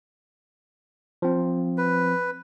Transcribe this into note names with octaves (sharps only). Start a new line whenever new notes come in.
F3 C4
B4